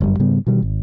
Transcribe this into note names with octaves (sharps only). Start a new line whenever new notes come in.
G1 F#2 G3
G#2 C#3 G3 B3
B2 D#3 E3 G3
G#1